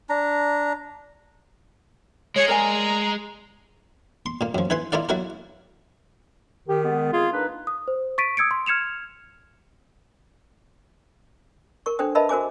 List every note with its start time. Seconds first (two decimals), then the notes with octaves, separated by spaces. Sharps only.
0.09 D4 A#5
2.36 G#3 G#4 C#5
2.48 A#4 D5 G#5 A#5
4.26 C6
4.41 A#2 A#3
4.55 F#2 F3
4.70 E4 B4 G#5 C6
4.92 E4 F4 A#4 D5 F5
5.09 F#3 E4 F#4 A#4
6.69 D#3 G4
6.85 G#3 B3
7.13 G#3 C4 F4 G#4
7.33 A#3 D4 D#4 B4
7.67 D#6
7.88 C5
8.18 C#6 A6 B6 D7 D#7
8.37 D#6 E6 G#6 C#7 D7
8.51 C6
8.66 F6 G#6 C#7 E7 F7
11.86 A#4 C#6
11.99 D4 A4 C5 G5 D#6
12.15 A#4 B4 D#5 E5 A5 B5
12.29 F#4 A#4 C5 G#5 D6